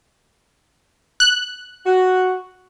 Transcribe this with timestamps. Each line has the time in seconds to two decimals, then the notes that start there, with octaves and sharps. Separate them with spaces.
1.20 F#6
1.85 F#4